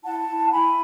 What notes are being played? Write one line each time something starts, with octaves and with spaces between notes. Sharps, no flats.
E4 F#5 A5
E4
E4 G#5 B5